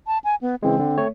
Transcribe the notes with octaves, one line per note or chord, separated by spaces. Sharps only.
A5
G#5
B3
C#3 E3 G#3 C4
D3
A3 C#5